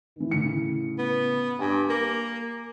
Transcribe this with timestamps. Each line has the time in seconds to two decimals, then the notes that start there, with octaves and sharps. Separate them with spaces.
0.16 D#3 E3
0.31 A2 C#3 C#7
0.99 B3
1.59 G2 G#5 D6
1.89 A#3